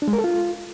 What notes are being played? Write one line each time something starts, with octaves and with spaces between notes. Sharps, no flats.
D4
G#3
A#4
A4
F4